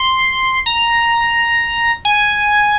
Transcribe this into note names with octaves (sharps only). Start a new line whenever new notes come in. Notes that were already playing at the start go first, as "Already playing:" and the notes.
Already playing: C6
A#5
G#5